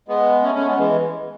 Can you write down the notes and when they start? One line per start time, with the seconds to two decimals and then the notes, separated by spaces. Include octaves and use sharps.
0.08 G#3 B3
0.43 A3 C#4
0.55 A3 C#4
0.66 G#3 B3
0.78 E3 G#3